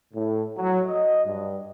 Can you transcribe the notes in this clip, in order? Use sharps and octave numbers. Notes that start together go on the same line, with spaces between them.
A2
F#3
D#5
G2